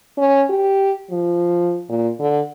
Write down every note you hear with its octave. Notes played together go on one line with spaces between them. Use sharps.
C#4
G4
F3
A#2
D3